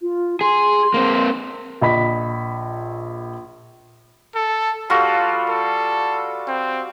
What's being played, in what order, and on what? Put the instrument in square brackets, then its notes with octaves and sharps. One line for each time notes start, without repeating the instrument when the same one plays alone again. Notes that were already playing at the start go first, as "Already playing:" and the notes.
[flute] F4
[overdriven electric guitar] G#4 [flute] C6
[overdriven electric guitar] A#3 C4
[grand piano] A#1 D#5 B5 B6
[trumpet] A4
[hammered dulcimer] G3 F4 F#4 [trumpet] A4
[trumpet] A4
C4